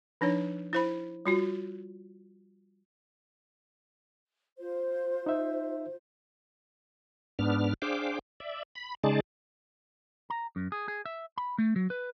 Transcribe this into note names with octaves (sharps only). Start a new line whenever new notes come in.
F3 D4 D#4 C#5
E4 C5 B5
G3 F4 F#4
F4 C5
D#4 E5
G#2 B3 D4 F6
D4 G#4 C5 F5 G5 D6
D5 E5
B5
C#3 G#3 D#4 G#4 D5 A5
A#5
F#2
G#4
G#4
E5
B5
A3
F#3
B4